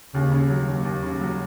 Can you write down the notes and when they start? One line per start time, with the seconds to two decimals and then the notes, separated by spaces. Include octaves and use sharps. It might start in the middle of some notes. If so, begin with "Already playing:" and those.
0.14 D#2 C#3
0.32 C#3
0.50 F#3
0.68 D#2
0.85 D#2
1.03 C#3
1.21 F#3